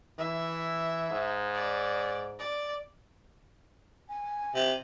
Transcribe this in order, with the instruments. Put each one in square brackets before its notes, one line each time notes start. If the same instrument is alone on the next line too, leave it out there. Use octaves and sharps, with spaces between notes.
[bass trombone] E3 [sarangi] E5
[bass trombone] G#2
[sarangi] D5
D5
[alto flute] G#5
[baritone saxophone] C3